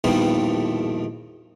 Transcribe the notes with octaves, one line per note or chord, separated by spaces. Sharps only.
A#1 E2 G2 B2 D#3 F3